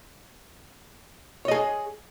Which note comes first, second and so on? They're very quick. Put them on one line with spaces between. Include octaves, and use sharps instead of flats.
C#5 D#5 G#4